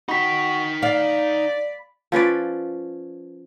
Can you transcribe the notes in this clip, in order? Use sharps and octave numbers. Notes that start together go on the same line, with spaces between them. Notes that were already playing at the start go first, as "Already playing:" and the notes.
D#4 F#4 G5 B5 B6
D5 F5
F3 C#4 B4 D5